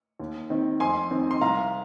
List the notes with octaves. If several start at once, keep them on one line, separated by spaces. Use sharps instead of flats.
D#2
D#3 C4
F2 G#5 C6
D#3 C4
C6
C2 F5 A#5